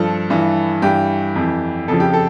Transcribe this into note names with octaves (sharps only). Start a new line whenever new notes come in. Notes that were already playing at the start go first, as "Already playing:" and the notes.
Already playing: G2 F3 A4
G2 E3
G2 E3 G4
F2 E3
F2 C#3 F3 A4
G4
A4